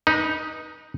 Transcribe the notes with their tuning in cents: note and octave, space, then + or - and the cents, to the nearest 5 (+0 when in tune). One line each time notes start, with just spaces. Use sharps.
D#4 +0 B4 -25